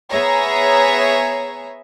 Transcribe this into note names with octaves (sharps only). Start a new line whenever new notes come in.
B3 G#4 C#5 E5 A#5